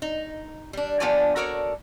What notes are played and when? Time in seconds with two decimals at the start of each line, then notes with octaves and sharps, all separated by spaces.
0.02 D#4
0.73 G3 D4
1.00 F3 B3 D4 G4 D5 G#5
1.36 F#4 A4 A#4 C#5 D5